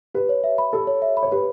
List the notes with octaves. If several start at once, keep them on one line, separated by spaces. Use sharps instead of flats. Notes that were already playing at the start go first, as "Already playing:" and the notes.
G4 B4
C#5
E5
B5
G4 A4
C#5
E5
B5
C#5
G4 B4